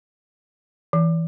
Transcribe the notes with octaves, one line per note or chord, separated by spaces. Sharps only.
E3